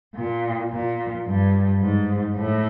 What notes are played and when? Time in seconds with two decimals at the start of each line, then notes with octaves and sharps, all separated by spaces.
0.15 A#2
0.71 A#2
1.27 G2
1.81 G#2
2.37 A2